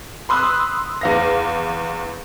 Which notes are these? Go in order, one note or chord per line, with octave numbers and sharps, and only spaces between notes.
B5 C6 D#6 E6 F#6
E2 F5 A#6